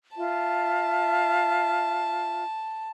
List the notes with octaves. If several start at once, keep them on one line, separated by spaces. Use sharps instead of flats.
F4 E5 A5